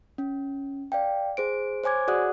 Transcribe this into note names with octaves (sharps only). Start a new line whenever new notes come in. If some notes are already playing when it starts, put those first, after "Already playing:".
C#4
D5 F5 G5
G#4 C5 D7
C5 C#5 G#5 D6 G#6
F#4 G#4 D5 F#5 D#6 F#6